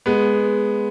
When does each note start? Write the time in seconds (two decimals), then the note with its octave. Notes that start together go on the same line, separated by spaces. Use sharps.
0.06 G#3 B3